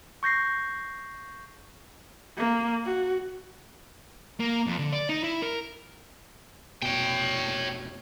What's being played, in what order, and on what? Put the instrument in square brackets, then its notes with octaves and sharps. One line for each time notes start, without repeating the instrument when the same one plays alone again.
[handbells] C#6 G6 A#6 C7
[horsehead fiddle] A#3
F#4
[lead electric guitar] A#3
F2
D3
D5
D#4
E4
A#4
[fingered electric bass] F1 B2 [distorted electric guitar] C#5 G5